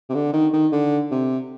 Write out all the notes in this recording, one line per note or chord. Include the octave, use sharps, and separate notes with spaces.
C3
D3
D#3
D#3
D3
C3